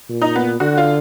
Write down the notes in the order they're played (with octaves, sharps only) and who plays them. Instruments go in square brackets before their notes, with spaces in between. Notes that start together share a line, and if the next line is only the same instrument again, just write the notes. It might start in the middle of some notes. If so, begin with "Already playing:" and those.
[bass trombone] A#2
[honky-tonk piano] D#4
B3
[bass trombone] D3 [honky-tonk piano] F#4
[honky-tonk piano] F4